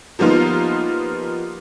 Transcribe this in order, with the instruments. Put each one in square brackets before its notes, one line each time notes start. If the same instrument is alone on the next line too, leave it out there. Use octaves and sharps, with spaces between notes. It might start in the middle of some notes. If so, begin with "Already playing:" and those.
[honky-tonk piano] F3 G3 A#3 B3 D#4 F4